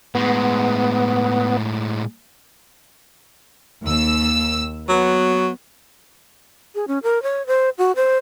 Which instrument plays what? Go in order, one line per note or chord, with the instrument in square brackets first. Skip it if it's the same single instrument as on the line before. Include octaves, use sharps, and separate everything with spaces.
[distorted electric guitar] A2 G#3 [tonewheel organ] B3
[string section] D#2 E6
[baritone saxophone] F#3 [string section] B3
[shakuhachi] G#4
C#4
A#4
C#5
C5
F#4
C5